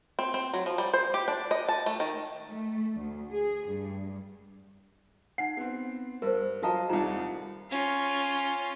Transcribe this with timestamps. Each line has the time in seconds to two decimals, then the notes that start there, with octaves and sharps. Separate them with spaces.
0.19 C4
0.34 C4
0.54 F#3
0.66 F3
0.78 G3
0.94 C5
1.14 G4
1.28 D4
1.51 D#5
1.69 A5
1.86 A3
2.00 D#3
2.51 A3
2.96 D2
3.30 G#4
3.66 G2
5.38 D#4 F#5 C7
5.57 B3 C4
6.22 G2 A#4 C5
6.62 F#3 F4 A4 D#5 A5 A#5
6.89 D#1 C2 D#4 F4 A#5
7.70 C#4 F4